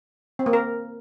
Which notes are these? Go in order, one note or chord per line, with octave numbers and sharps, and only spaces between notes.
C4
A#3
A#4